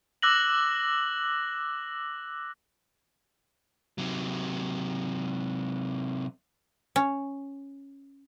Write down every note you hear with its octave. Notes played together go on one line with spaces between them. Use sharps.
D6 E6 F#6 A#6 F#7
C3 F#3
C#4